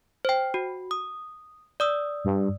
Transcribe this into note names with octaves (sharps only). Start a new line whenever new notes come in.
C5 G5
F#4
D#6
D5 D#6 E6
G2